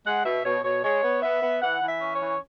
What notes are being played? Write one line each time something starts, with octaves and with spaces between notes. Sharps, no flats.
G#3 F#5
B2 E5
B2 C#5
B2 C#5
G#3 C#5
B3
B3 E5
B3
E3 F#5
E3
E5
C#4
C#5
E3